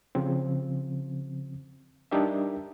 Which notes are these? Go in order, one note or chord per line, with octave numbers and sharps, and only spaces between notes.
C#3 F3 C4
G3 D4 D#4 G4 A#4 E5